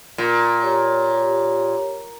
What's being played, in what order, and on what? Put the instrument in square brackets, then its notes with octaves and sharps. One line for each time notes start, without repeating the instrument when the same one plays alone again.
[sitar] A#2
[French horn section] G4 C#5